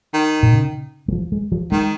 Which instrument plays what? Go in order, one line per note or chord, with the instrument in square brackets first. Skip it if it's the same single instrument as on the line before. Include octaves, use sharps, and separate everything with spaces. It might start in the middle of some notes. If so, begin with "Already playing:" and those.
[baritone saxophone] D#3
[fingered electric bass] A#2
C#3
G#3
F3
G#3
F3
[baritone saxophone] D#3 [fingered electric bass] G#3